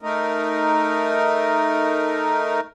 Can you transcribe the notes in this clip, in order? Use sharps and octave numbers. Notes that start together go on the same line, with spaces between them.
A3 D#4 A#4